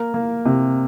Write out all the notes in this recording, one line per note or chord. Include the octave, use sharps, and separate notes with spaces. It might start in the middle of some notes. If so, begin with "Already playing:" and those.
Already playing: A#3 A#4
A#3
C3